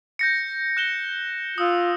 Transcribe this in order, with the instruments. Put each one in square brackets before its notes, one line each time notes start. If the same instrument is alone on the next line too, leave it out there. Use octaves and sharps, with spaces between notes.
[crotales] G6 A#6 C#7
F#6 E7 G7
[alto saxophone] F4 [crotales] D#6 E6